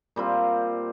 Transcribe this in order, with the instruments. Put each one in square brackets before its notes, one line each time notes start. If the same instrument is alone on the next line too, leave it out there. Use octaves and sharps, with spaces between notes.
[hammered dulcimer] A#2 G3 C4 F4